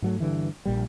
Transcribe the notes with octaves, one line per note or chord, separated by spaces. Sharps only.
G#2 F#3 A3
G2 D3 E3
A#1 A#2 G3